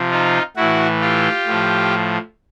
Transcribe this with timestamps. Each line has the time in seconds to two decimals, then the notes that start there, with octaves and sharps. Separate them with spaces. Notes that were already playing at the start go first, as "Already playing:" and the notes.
Already playing: C3 F3
0.11 D#4 F4
0.56 A2 E3 E4 F#4
1.01 F4 G4
1.46 A2 F3